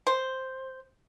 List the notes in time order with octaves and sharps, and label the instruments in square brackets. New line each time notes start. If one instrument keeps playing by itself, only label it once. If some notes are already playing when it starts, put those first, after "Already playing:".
[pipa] C5